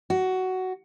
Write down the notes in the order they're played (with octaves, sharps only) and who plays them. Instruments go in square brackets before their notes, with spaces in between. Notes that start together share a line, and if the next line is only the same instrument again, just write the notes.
[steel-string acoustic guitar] F#4